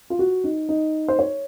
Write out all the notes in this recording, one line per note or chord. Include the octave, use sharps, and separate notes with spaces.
F4
F#4
D#4
D#4
C5
C#5